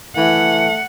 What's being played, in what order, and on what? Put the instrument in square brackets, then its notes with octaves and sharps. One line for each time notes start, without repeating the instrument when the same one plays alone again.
[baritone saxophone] E3 [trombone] A3 [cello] F#5